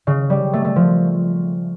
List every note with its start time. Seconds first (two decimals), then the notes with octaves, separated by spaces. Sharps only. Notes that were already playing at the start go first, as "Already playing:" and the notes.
0.07 C#3
0.30 G3
0.53 A3
0.65 A3
0.76 F3